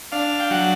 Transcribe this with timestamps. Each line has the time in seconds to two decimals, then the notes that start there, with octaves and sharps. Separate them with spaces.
0.12 D4 F5
0.40 G5
0.51 F#3 F#5